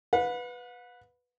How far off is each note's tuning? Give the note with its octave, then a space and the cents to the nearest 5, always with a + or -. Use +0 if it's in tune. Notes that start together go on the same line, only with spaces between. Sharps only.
B4 +0 F#5 -45